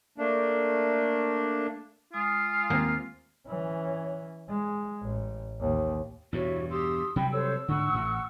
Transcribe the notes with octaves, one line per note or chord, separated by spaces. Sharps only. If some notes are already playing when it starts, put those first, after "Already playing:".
A3 A#3 D4
G#3 F4 G#5 D#6
D#2 A#3 C4
E3 C#4
G#3
A1
A1 D#2
E2 G2 B2 E4 F#4 C#5
G4 C6 D#6 E6
C3 F#3 G3 G5 B5
A4 C5 C#5 E6
G#2 D3 F#5 C#6
A1 A2